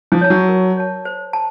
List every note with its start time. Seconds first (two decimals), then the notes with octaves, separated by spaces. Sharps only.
0.12 F3
0.21 C#5 A5
0.30 F#3
0.49 A#4
0.77 C#5 A5
1.05 C5
1.33 A5